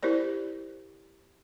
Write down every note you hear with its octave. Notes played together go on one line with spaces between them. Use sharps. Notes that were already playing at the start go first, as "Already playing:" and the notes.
E4 G4 A#4 C5 D5